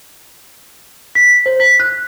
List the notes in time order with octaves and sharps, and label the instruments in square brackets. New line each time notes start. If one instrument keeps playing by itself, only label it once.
[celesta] B6
C5
B6
F#6